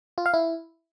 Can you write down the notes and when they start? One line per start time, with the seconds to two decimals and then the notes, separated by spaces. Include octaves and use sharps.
0.18 F4
0.26 F5
0.34 E4